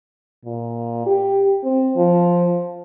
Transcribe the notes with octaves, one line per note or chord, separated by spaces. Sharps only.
A#2
G4
C4
F3